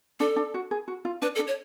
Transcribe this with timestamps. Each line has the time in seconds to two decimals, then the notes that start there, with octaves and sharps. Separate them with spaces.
0.20 D4 A4
0.36 D4
0.54 F#4
0.71 G#4
0.88 F#4
1.05 F4
1.22 D4 B4
1.35 A4
1.39 D4
1.47 C#5